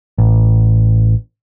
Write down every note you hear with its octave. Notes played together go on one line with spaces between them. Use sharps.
A1